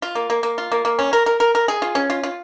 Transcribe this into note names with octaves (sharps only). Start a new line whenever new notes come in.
F4
A#3
A#3
A#3
F4
A#3
A#3
C#4
A#4
A#4
A#4
A#4
G#4
F4
C#4
F4
F4